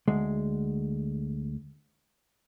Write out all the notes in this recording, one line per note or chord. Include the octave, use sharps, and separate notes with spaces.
D2 G#3